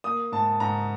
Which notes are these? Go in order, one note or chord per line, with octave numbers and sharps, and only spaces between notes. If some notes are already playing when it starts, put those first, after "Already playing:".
A#3 D#6
G#2 A5
G#2 A#5